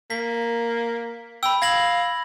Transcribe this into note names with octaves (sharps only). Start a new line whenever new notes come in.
A#3 B6
G5 B5 E6
F5 G#6 A#6 F#7